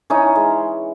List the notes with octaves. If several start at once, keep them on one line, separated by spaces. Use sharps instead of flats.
E3 C#4 D#4
G#3